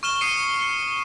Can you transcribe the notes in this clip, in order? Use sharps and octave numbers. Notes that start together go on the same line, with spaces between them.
C#6 F6 E7 G7
D#6 C7 C#7 D#7
C#7